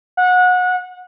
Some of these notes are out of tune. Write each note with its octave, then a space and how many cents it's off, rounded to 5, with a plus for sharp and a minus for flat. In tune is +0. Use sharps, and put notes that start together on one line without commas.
F#5 -25